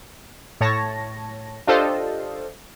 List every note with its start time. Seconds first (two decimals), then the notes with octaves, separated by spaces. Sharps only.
0.61 A2 C#5 A5 A#6
1.67 D4 F4 G4 A4 C5 D#5